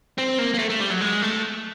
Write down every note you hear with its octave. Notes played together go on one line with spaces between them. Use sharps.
C4
A#3
A#3
A3
A3
G3
F#3
G#3
A3